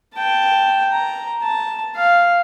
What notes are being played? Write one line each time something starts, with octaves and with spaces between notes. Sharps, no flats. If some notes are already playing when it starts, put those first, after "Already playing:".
G5 A5
A#5
A5
F5